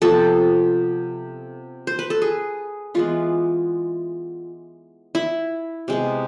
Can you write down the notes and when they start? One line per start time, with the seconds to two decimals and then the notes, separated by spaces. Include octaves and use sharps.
0.02 C3 F3 B3 A4
1.87 C5
1.99 B4
2.10 A4
2.22 G#4
2.94 E3 G#3 B3 F4
5.15 E4
5.88 C3 G#3 B3